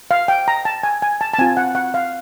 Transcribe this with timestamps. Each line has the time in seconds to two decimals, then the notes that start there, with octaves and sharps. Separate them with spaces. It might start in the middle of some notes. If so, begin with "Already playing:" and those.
0.11 F5
0.28 G5
0.48 A#5
0.65 A5
0.83 G#5
1.02 G#5
1.21 A5
1.34 A5
1.38 C4 F4 G#5
1.57 F#5
1.75 F#5
1.94 F5